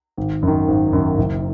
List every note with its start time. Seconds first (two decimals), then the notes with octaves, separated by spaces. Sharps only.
0.17 G#1
0.43 F#2 D#3
0.68 G#1
0.93 F#2 D#3
1.18 F#1